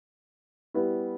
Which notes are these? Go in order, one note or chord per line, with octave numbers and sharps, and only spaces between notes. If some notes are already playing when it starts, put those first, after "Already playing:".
G3 B3 E4